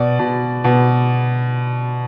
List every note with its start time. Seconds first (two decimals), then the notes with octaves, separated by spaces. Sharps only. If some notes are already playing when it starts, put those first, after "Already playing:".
Already playing: B2 D5
0.19 B2
0.64 B2